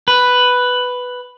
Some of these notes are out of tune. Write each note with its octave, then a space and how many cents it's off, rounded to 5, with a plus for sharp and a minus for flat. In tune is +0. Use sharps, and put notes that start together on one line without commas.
B4 +5